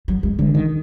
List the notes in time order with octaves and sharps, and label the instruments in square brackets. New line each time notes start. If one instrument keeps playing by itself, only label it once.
[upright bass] F#3
G#3
[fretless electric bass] D3 [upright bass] G#3
[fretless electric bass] D#3